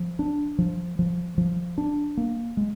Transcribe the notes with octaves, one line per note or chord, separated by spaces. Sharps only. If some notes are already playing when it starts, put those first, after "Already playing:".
Already playing: F3
D4
F3
F3
F3
D4
A#3
G#3